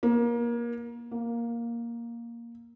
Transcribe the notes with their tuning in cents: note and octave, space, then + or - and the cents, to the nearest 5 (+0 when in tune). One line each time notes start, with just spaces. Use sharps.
A#3 +25
A#3 +5